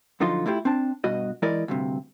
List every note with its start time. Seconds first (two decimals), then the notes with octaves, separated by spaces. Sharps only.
0.20 F#2 D3 F3 D#4 F4 C6
0.46 A3 E4 F4 G4
0.65 C4 D4 A5
1.04 G2 B2 F#4 D#5
1.42 E3 G#3 E4 A#4 D5 D#5
1.68 D2 G2 C3